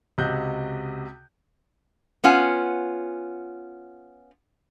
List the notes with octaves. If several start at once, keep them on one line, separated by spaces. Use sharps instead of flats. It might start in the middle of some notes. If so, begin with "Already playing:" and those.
C#2 C3 F#4 D#5 F#6 G6
B3 C#4 F4 F#5 G#5